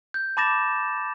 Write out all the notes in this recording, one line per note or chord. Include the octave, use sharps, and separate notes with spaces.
G6
A5 B5 D6 A6 A#6 E7